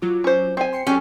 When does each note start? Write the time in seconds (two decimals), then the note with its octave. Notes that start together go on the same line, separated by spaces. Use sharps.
0.02 F#3 F4 D6
0.24 C#4 C5
0.57 C4 G4 G#5
0.73 C6 C7 C#7
0.87 F#3 C#4 G4 A4